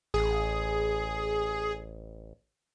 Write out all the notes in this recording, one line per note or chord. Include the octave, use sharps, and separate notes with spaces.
A1 G#4